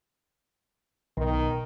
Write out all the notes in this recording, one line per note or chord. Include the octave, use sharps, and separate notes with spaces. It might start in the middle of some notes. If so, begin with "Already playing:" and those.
B1 B2 D#3